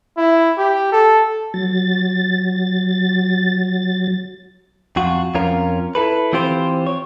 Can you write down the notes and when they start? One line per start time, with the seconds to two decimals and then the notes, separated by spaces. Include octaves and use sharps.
0.17 E4
0.58 G4
0.92 A4
1.54 F#3 A6
4.96 F2 F4 F#4
5.35 F2 C#4 F4 A#4
5.95 E4 A4 B4
6.33 E3 C4 F4 G4 C5
6.87 C#5